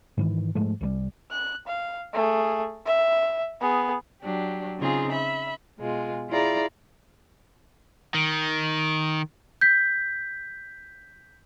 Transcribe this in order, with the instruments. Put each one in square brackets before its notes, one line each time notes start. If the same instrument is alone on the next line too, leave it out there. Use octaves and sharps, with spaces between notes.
[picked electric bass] G#2 D#3 E3
G#2 F3 G#3 A3
C2 E3 G3
[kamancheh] F#6
F5
A3 G#4
E5
B3 G#4
[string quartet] F#3 D4 G4
C#3 C4 D#4 F4 G#4
E5 B5
B2 G#3 F4
E4 F4 G#4 D5 A#5
[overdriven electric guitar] D#3
[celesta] G6 B6